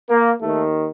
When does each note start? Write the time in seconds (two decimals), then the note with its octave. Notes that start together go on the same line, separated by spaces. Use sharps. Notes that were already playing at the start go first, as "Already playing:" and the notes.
0.10 A#3
0.42 D#2 D#3 A3